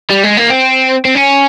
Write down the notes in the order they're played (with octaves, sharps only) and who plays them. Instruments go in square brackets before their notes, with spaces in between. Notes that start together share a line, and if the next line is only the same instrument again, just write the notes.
[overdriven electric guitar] G3
G#3
A#3
C4
C4
C#4